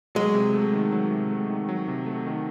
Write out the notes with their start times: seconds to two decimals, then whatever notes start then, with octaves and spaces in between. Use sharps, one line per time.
0.15 F#3 G#3
0.34 C3
0.54 A3
0.73 D#3
0.92 F#3
1.11 C3
1.31 A3
1.50 D#3
1.69 F#3
1.88 C3
2.06 A3
2.26 D#3